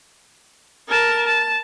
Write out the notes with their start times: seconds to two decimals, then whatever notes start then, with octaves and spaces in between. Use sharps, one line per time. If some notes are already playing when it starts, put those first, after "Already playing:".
0.88 A#4 A5
1.27 A5